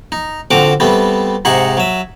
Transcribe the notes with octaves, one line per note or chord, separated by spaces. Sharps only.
D#4
D3 F3 C4 F#4 D6
G3 A3 B3 C4
G#2 C3 D#4 G#4 F#5 C#6
F#3 E5